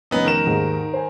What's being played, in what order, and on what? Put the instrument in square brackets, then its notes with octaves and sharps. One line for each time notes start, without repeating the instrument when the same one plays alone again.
[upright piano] F1 C#4 [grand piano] B3 D#4
[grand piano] D#3 A#4 E7
[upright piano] D#2 G#2
C5 G#5